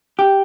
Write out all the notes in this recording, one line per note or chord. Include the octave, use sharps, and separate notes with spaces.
G4